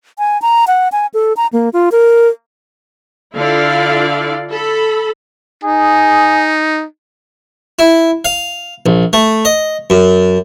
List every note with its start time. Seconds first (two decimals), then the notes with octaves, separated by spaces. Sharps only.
0.18 G#5
0.42 A#5
0.67 F#5
0.92 G#5
1.14 A4
1.37 A#5
1.53 A#3
1.73 F4
1.92 A#4
3.35 D3 E4 F4 D5 F5
4.51 A4 B5
5.64 D#4 G#4
7.79 E4
8.25 F5
8.86 A#1
9.13 A3
9.45 D#5
9.90 F#2